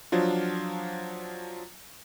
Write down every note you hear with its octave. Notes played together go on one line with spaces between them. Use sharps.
F3 F#3 D4 F4